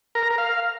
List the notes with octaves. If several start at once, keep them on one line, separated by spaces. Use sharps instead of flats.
A#4
A#5
A#4
F5